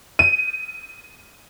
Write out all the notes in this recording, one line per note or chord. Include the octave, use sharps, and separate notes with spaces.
D#7